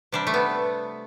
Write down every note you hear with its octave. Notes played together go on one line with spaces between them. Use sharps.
C3 G3 D4
A3
B3